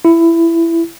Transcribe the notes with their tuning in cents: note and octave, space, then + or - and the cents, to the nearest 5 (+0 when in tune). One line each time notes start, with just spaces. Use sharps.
E4 +15